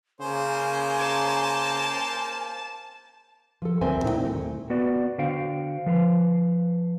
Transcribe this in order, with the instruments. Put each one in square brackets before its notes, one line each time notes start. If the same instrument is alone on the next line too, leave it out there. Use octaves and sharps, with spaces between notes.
[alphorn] C#3 [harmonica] A#3 C5 [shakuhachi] G#5
[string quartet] A5
[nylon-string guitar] F3 A4
D2 C4 A#4 C5 E5 G#5
A#2 D#4 E4 D5 G5
D#2 A3
[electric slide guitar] B3 F#4 B4 D5
D3 F#4 C5 F5 G5
F3 B4 F5